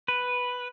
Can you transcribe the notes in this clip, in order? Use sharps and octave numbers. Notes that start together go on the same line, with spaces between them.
B4